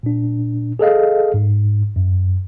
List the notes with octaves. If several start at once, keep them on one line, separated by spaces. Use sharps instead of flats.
A#2 D4
G#4 A4 D#5 F5
G#2
F#2